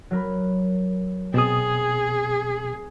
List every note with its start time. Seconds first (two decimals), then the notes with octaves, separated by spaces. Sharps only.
0.11 F#3 A#4 B5
1.34 B2 C4 G#4 D#6 A6 E7